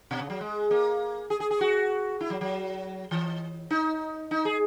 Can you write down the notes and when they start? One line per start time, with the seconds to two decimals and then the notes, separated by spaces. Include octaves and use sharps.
0.11 B2
0.20 C#3
0.30 F#3
0.41 G#3
0.71 A#3
1.30 G#4
1.40 G#4
1.51 G#4
1.61 F#4
2.21 E4
2.30 F#3
2.41 F#3
3.11 E3
3.70 D#4
4.31 D#4
4.45 G#4